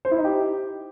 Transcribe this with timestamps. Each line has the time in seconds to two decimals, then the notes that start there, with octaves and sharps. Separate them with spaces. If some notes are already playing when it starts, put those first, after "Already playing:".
0.05 C5
0.11 E4
0.18 D#4
0.25 G4